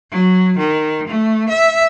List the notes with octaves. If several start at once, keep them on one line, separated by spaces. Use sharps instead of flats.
F#3
D#3
A3
E5